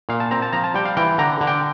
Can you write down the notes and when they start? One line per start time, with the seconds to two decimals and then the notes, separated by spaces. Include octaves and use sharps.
0.09 A#2 F5
0.20 A5
0.31 C4 A#5
0.42 A5
0.53 F3 A#5
0.64 A5
0.74 G3 G5
0.85 F5
0.97 E3 G5
1.18 D3 A#5
1.41 D3
1.47 G5